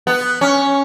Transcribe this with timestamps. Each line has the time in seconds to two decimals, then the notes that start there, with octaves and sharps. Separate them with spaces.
0.07 B3
0.41 C#4